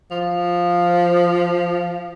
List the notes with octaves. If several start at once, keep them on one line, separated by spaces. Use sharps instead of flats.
F3